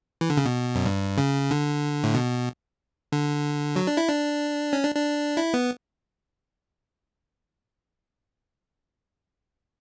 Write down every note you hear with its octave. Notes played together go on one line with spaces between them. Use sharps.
E3
D3
C#3
B2
F#2
G2
C#3
D3
A2
B2
D3
F#3
D4
E4
D4
C#4
D4
D4
E4
B3